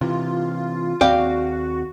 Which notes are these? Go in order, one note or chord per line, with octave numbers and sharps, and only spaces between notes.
C3 E3 F4
D#2 C4 F#4 D5 F5 G5